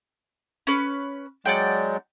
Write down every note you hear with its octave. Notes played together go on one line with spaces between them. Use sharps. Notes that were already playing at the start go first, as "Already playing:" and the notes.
C#4 B4
F#3 G#3 D5 F#5 G5